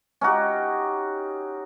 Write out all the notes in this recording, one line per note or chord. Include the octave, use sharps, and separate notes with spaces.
C#4 D#4 F#4 G4